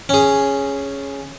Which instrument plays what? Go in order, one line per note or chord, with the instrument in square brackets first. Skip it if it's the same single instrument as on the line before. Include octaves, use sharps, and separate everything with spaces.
[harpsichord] C#4 G#4